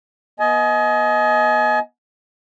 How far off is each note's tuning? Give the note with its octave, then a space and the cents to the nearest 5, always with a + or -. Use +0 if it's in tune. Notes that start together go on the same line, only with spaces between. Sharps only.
B3 -30 D#5 +15 G#5 +35